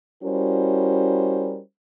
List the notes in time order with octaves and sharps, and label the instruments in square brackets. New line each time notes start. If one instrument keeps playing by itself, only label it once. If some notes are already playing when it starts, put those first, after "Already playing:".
[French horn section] G3 C#4 E4 F#4 A#4 C5